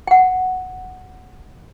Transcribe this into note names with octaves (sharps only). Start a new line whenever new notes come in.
F#5 G5